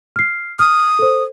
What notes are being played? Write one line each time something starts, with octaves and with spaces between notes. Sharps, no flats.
F6 C7
D#6 F6
A4 C5